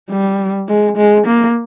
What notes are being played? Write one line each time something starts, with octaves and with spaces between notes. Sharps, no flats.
G3
G#3
G#3
A#3